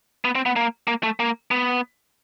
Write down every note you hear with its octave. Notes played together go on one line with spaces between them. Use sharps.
B3
C4
B3
A#3
A#3
A3
A#3
B3